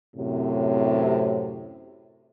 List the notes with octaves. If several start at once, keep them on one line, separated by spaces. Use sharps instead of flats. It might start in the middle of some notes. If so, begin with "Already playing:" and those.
F#2 A2 C3